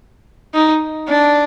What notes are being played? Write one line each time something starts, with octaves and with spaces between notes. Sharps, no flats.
D#4
D4